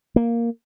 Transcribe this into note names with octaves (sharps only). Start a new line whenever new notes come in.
A#3